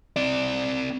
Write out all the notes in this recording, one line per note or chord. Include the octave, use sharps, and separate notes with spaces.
C4 D5